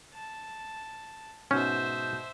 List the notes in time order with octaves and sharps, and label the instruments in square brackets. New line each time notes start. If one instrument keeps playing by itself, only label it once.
[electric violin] A5
[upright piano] G#2 B2 [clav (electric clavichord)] C#4 [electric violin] C5 E5 [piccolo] G6